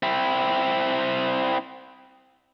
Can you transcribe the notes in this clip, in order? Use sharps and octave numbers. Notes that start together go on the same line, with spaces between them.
C4 E4